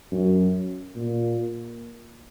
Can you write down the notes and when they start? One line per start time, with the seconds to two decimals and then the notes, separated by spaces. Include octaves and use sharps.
0.12 F#2
0.95 A#2